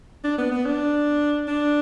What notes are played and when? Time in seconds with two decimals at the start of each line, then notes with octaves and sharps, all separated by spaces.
0.24 D4
0.38 B3
0.52 B3
0.66 D4
1.48 D4